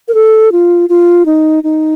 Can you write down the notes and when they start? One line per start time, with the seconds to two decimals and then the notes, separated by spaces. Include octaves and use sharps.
0.08 A#4
0.14 A4
0.52 F4
0.89 F4
1.26 D#4
1.64 D#4